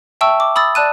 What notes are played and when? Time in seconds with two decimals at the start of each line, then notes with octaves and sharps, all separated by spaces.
0.21 E5 G5 A5 C#6 E6
0.40 D6
0.56 B5 D#6 E6 A6
0.75 D5 A5 F#6 D#7